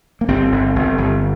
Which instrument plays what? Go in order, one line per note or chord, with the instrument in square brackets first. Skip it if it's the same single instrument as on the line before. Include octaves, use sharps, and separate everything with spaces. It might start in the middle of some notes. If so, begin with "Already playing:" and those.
[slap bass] A#3
G1 C4
G1
G1
G1